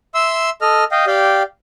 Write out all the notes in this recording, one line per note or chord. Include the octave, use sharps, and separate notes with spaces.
E5 C6 E6
A4 D#5 F6
D#5 F5 G5
G4 D5 F5 G5